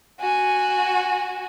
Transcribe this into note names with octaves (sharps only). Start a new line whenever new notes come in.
F#4 G#5